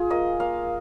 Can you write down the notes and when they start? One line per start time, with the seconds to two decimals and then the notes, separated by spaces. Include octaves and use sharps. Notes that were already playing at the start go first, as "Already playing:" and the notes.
Already playing: F4 G#4
0.10 A#3 D#5
0.40 A#3 F5